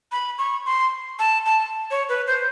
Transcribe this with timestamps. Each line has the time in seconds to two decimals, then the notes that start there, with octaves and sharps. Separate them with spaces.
0.12 B5
0.38 C#6
0.66 C6
1.19 A5
1.46 A5
1.91 C#5
2.09 B4
2.27 C5